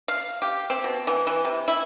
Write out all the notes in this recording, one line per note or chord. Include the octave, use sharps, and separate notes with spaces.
F5
G4
C4
B2
E3
E3
C3
E4